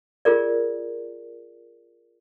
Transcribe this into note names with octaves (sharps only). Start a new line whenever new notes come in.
F4 G#4 A#4 D5